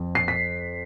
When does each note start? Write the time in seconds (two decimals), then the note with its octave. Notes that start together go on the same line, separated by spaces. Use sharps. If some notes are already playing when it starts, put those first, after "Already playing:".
Already playing: F2
0.15 C7
0.28 B6